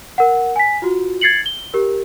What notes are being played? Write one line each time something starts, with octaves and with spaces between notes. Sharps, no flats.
A#4 F#5
G#5 B6
F4 F#4
G#6 A6 C7 C#7 F#7
G7
G4 A#4